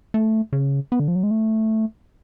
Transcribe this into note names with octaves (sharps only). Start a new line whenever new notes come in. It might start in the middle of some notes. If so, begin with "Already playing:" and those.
A3
C#3
B3
D3
F3
F#3
G#3
A3